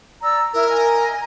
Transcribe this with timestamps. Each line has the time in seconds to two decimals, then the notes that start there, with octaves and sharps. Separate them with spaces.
0.22 D5 A#5 E6
0.53 E4 A#4 A#5
0.69 D#5 G#5 A#5